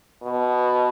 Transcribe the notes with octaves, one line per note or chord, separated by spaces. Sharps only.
B2